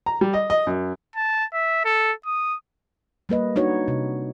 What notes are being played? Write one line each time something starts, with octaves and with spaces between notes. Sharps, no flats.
A#5
G3
D#5
D#5
F#2
A5
E5
A4
D#6
G3 A#3 B4 D#5
D4 D#4 F#4 C#5
C3